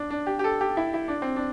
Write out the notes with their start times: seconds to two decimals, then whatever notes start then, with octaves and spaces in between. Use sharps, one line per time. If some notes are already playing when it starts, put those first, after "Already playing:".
Already playing: D4
0.10 D4
0.27 G4
0.39 G4
0.44 A4
0.61 G4
0.77 E4
0.94 E4
1.08 D4
1.22 C4
1.36 D4